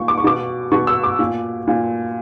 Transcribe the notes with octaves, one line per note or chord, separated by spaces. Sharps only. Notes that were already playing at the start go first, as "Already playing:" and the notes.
Already playing: A#2 C#6
D6
C#6
B2 D6
B2 C#6
E6
D6
A#2
A#2